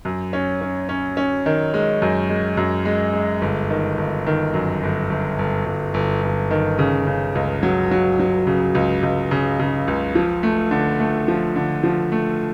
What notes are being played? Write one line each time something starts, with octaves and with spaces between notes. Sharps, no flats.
F#2
C#4
C#4
C#4
C#4
D#3
G#3
F#2
G#3
F#2
G#3
G#3
G1
D#3
G1
D#3
F#2
G1
G1
G1
G1
G1
G1
D#3
C#3
C#3
C#2
F#3
F#3
F#3
C#3
C#2
C#2
C#3
C#3
C#2
F3
A3
D3
A3
F3
D3
F3
A3